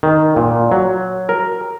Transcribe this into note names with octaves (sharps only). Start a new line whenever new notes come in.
D#3
A#2
F#3
A#4